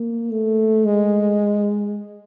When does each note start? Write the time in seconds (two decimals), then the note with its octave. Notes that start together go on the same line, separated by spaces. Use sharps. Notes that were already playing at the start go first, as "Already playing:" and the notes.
Already playing: A#3
0.31 A3
0.85 G#3